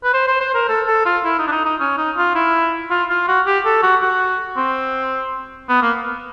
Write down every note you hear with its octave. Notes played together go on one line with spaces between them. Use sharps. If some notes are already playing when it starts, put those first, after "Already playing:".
B4
C5
C5
C5
A#4
A4
A4
F4
E4
D#4
D4
D#4
D#4
C#4
D#4
F4
E4
F4
F4
F#4
G4
A4
F#4
F#4
C4
B3
A#3